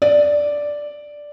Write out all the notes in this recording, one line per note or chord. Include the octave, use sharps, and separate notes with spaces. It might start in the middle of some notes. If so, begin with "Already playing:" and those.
D5